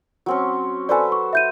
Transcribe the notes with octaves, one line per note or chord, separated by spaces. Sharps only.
F#3 C4 C#4
A4 B4 C5 D5 G#5
C#6
E5 G6 D#7